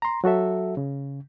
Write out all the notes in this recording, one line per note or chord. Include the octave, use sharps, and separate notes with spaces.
A#5 C6
F#3 F#4 A4 E5
C#3